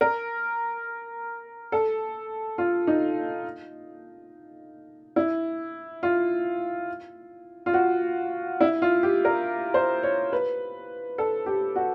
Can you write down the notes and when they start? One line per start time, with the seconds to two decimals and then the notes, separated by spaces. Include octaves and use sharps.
0.01 A#4
1.72 A4
2.58 F4
2.87 D#4
5.16 E4
6.03 F4
7.66 F4
7.74 F#4
8.60 E4
8.82 F4
9.03 G4
9.25 A#4
9.74 C5
10.03 C#5
10.33 B4
11.18 A4
11.46 G4
11.76 F#4